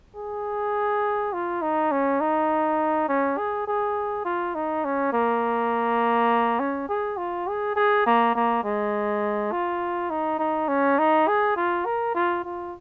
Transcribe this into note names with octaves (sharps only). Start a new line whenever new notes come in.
G#4
F4
D#4
C#4
D#4
C#4
G#4
G#4
F4
D#4
C#4
A#3
C#4
G#4
F4
G#4
G#4
A#3
A#3
G#3
F4
D#4
D#4
C#4
D#4
G#4
F4
A#4
F4
F4